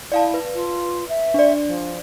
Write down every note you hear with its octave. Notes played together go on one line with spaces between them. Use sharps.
E4 D5 F5 A5
B4
F4
E5
D4 D5
F3